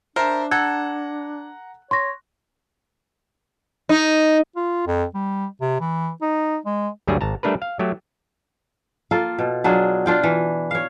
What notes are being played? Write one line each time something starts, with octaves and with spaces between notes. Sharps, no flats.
D4 A#4 C5 E5 A5
A4 F#5 A#5 F#6 G#6
C#5 C6 C#6 A#6
D#4
F4
F2
G3
C3
E3
D#4
G#3
D2 G2 D3 F#3 G3 G#4
G#1 A5 A#5
G3 A3 D4 A#4 B4
F5
F#3 A3 G4
A#3 F4 A4
B2
F#3 D4 F4 G#4
D4 F4 G5
E3
C#5 F5